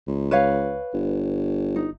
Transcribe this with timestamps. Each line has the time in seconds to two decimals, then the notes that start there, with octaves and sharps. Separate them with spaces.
0.07 C#2
0.31 B4 C#5 F5
0.94 G1
1.76 D#4